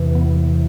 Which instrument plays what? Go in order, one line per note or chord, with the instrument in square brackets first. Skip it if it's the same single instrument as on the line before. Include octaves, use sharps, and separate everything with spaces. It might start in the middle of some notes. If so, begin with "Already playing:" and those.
Already playing: [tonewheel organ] E2 C3 E3
B3